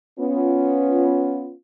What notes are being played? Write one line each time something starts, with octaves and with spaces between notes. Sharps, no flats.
B3 C#4 F4